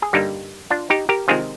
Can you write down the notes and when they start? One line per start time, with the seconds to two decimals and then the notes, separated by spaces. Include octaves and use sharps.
0.02 G#4
0.13 G2 D3 G3 A#3 D#4 G4
0.70 D4 F4
0.90 D#4 G4
1.09 G4 A#4
1.28 C3 D#3 G#3 C4 F4 G#4